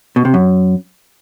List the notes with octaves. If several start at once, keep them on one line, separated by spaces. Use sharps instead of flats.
B2
C3
F#2